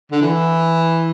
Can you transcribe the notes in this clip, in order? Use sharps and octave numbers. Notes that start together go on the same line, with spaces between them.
D3
E3